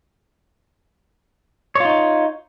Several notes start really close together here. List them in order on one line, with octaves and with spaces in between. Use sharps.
C#5 F4 D#4